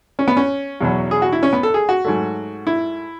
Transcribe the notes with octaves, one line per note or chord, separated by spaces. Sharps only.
C#4
B3
C#4
E2 B2 F#3
G#4
F#4
E4
C#4
B3
A4
G#4
F#4
G#2 F#3 A3
E4